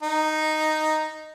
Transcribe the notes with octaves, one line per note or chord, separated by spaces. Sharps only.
D#4